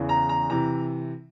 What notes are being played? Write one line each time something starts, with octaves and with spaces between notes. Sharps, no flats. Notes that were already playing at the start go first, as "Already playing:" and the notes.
Already playing: E2 C#3 E3
A#5
A#5
C3 E3 A#5